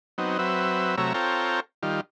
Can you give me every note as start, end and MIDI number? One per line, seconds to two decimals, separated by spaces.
0.18 0.38 54
0.18 0.38 59
0.18 0.38 60
0.18 0.38 63
0.39 0.96 54
0.39 0.96 60
0.39 0.96 71
0.39 0.96 76
0.98 1.13 48
0.98 1.13 54
0.98 1.13 57
0.98 1.13 73
0.98 1.13 76
0.98 1.13 82
1.14 1.60 60
1.14 1.60 65
1.14 1.60 69
1.14 1.60 73
1.14 1.60 79
1.14 1.60 82
1.83 2.01 51
1.83 2.01 55
1.83 2.01 65